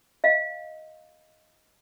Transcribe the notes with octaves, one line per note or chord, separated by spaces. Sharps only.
D#5 F5